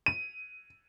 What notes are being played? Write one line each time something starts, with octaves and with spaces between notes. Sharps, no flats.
D#7